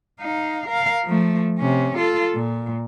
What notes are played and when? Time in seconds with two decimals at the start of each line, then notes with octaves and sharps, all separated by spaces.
0.21 D#4 F5
0.69 A#4 F5
1.05 F3 A3
1.59 C3 C#4
1.97 F4 A4
2.35 A#2